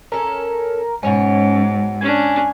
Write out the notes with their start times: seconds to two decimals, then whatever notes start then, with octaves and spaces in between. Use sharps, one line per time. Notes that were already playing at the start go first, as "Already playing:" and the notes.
0.12 C#4 A4 A#4
1.03 G#2 B2 C#4 C#5 G#5
2.01 C#4 D4 G#5